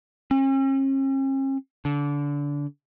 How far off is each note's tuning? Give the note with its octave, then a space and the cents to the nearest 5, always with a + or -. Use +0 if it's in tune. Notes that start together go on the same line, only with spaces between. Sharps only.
C#4 -45
D3 -25